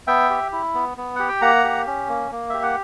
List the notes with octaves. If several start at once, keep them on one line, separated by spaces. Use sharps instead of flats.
B3 E5 G5
G4
E4
B3
B3
G4 F#5
G5
A#3 F#5 A#5
G4
C#4
A#3
A#3
G4 E5
F#5